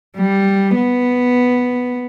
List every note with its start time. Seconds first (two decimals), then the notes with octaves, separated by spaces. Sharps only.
0.17 G3
0.75 B3